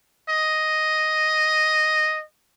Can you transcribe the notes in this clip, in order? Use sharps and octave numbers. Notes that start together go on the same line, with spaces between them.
D#5